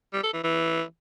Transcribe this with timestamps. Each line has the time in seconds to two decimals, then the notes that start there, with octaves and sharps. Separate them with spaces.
0.13 G3
0.23 A4
0.33 E3
0.44 E3